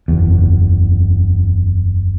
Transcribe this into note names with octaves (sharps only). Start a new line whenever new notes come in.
F#1 E2